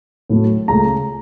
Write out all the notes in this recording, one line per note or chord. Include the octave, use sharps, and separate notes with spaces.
A2 F#3 A3
C#2 C#3 A3 A#5